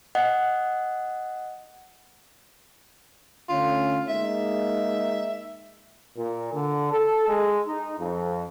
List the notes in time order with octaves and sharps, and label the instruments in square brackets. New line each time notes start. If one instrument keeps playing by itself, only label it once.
[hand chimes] D#5 F#5
[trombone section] D3 A3 C#4 [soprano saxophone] F4
[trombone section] G#3 A#3 D#4 [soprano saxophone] E5
[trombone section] A#2
D3
A4
G#3
D#4
F2